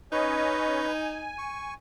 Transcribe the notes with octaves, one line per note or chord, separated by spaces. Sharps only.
C#4 D#4 B4 C#5 D#5
G#5
C#6